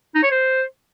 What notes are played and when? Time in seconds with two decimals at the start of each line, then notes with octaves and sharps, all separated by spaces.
0.15 D#4
0.23 C#5
0.31 C5